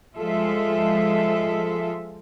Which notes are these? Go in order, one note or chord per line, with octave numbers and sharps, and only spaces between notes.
F3 G#3 F4 A4 E5